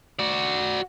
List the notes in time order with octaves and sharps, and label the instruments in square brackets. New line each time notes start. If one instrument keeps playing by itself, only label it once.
[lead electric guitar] F#4 D5